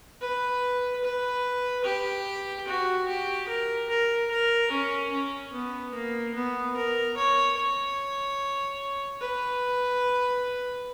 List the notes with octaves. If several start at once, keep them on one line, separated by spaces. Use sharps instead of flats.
B4
B4
G4
F#4
G4
A#4
A#4
A#4
C#4
C#4
B3
A#3
B3
A#4
C#5
C#5
B4